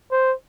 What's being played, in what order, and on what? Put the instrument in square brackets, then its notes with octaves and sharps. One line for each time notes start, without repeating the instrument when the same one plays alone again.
[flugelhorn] C5